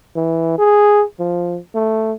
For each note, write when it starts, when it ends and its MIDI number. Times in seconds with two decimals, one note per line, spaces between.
0.16 0.55 52
0.58 1.03 68
1.20 1.58 53
1.75 2.13 57